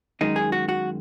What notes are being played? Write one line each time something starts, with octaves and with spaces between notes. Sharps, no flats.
F#2 D#3 G#3 D#4
G#4
F#4
F#4